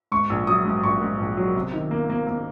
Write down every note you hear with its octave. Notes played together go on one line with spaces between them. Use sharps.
G#2 C#6
A#1
F#3 D#6
G#2
A#1 C#6
G#2
A#1
F#3
C3
D#3
A#3
A#3
A#3